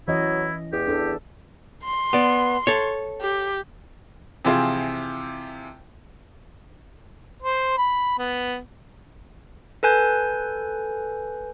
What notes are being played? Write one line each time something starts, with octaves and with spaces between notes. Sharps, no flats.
E3 F#3 C#4 E4 D#5
E2 G4
D4 A4
C6
B3 D5
A4 C#5
G4
C3 E3 F3 C4 F4 G#4
C5
B5
B3
A4 B4 G#5 G6